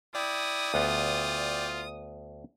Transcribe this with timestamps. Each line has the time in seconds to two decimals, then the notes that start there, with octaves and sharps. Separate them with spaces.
0.15 E4 D5 G5 D#6
0.74 D2 B3 F4 F#5